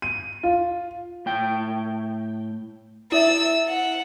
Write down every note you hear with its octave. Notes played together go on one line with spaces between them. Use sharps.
D#7
F4
A2 G5
E4 E5 E6 A6
F#5